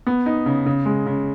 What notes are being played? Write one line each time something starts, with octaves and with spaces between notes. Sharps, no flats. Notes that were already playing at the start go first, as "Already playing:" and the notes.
B3
D#4
C#3
C#3
G#3
C#3